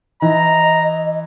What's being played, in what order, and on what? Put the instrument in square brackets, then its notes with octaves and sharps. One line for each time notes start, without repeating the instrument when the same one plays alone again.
[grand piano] E3 [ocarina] D#5 [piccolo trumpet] A#5